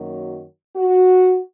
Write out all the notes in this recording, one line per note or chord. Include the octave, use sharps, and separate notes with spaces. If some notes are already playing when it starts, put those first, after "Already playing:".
Already playing: F#2 D#3 F#3 A#3
F#4